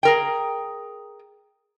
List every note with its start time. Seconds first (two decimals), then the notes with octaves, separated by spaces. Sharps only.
0.03 G#4 A#4 G5